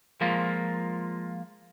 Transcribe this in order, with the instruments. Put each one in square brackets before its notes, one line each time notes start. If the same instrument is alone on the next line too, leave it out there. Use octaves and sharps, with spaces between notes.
[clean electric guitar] F3 G#3 A#3 F4